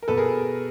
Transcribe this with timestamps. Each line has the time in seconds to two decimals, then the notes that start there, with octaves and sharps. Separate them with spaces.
0.03 A#4
0.08 B2 A4 B4
0.17 G#4 A#4